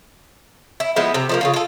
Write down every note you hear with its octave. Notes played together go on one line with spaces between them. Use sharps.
E4
F3 G#3 B3 E4
C3
F3 G#3 A#3
C#3 F3 F4
F4 A4